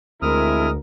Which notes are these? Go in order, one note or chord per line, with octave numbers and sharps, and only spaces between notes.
D2 G#3 C4 E4 A#4 D#6 F6